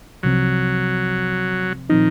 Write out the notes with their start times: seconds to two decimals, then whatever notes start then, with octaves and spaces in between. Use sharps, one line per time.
0.23 C2 C3 F3 F#3 C4
1.90 A#2 D#3 F3 C4 D#4